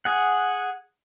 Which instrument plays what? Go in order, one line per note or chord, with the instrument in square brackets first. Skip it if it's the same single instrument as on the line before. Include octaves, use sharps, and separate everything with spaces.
[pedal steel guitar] G#4 F#5